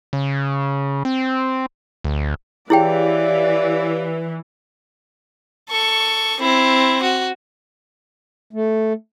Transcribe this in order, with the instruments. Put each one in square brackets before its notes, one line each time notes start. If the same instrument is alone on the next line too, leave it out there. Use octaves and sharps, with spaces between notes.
[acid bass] C#3
C4
D2
[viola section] E3 [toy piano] E4 G#4 G5 [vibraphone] G4 C#5 F5 [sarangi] D5
[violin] A4 C#6
C4 E4
F#4
[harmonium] A3